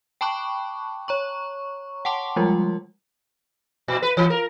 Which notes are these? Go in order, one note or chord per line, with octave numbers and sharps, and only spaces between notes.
G5 A5 B5 C#6 D6 F#6
C#5 A#5 C#6
F#5 G5 A5 C6 D6
F3 G3 G#3 F4
A#2
B4
E3
A#4